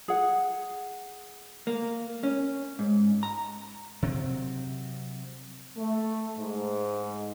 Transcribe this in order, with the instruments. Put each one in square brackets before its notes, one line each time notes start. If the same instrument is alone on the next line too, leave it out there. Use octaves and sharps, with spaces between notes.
[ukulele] G#4 F#5
[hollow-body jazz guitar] A#3
C#4
G#2
A#5
[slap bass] C3 F#3 C4
[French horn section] A3
G#2